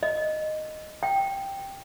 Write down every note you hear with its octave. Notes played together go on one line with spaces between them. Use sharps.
D#5
G5